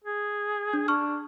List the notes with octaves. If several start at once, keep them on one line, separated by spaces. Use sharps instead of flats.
G#4
D4
D4 C#6 F6